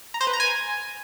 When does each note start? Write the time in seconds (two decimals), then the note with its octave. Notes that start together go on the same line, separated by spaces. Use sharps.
0.14 A#5
0.21 C5
0.27 B4
0.33 A#5
0.40 G#5